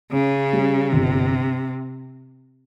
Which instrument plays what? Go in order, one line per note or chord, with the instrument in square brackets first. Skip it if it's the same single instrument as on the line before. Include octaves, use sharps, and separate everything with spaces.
[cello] C#3 [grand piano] C#4
[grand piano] G3
[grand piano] G1 [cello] C3